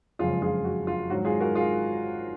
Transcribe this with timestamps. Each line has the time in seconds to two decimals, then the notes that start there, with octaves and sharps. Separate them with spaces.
0.19 F#1 F2 C#3 G#3 F4 G#4
0.42 F4 G#4
0.64 F#4
0.87 F4
1.10 G#1 G#2 F#3 F#4
1.25 F4 G#4
1.40 F#4 A#4
1.55 F4 G#4